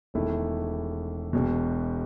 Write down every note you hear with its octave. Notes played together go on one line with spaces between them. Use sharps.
E1 E2 D#3 A3 E4
E1 E2 B2